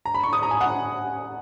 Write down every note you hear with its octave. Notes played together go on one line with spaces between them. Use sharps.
A#5
B5
C#6
D#6
A#5
G#5
F#5